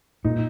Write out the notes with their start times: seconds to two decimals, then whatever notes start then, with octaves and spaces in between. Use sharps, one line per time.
0.24 A#2 D#4